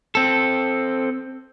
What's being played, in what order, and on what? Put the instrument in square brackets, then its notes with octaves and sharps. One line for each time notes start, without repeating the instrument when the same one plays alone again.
[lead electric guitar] C4 A4